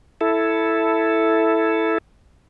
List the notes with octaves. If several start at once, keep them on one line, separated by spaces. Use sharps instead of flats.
E4 A4